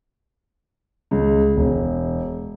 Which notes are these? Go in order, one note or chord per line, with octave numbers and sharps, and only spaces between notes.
C#2
E1